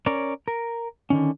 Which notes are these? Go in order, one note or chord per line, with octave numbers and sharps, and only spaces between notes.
C#4 A#4 C#5 D5
A#4
D3 D#3 C#4